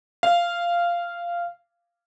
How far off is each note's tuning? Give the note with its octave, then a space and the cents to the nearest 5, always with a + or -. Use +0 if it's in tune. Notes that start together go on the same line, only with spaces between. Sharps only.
F5 -10